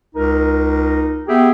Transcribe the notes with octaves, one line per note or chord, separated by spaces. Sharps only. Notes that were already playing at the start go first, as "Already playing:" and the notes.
C#2 D#4 A#4
B3 G4 G#4 E5 G5